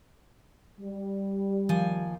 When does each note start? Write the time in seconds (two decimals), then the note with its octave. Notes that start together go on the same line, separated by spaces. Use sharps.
0.79 G3
1.69 D#2 F3 G#5